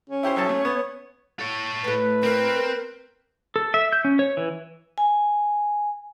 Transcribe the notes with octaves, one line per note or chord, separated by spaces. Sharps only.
C#4
E4 G4 C5 C#5
B1 A4 A5
A3
B3
A4 C#5
A2 A3 B4
C4 A#4
A4
E5
G6
C#4
C#5
E3
G#5